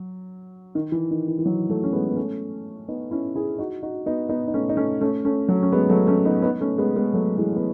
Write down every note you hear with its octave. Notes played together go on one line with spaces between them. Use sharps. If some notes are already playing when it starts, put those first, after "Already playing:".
Already playing: F#3
D#3
E3
D#3
E3
E3
D#3 F#3
F#3 A3
C#4
G#3 B3
B3
A3 C#4
B3 D#4
C#4 E4
E4 G#4
D#4 F#4
D#4 F#4
B3 D#4
B3 D#4
D#4
A3 C#4
D#4
A3 C#4
A3 C#4
A3 C#4
F#3 A3
C#4
G#3 B3
F#3 A3
A3 C#4
B3 D#4
B3 D#4
A3 C#4
G#3 B3
G#3 B3
F#3 A3
E3 G#3
B3